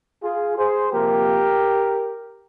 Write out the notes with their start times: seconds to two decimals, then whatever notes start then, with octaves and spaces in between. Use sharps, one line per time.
0.23 F4 G#4
0.57 G#4 C5
0.91 C3 F3 A#3 G4 A#4